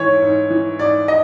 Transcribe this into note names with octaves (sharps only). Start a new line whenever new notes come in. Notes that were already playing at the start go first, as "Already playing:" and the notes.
Already playing: G#2 E3 C#5
G#2
E3
G#2 D5
D#5